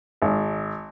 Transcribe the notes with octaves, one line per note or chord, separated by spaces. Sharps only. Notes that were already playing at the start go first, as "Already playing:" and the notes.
G#1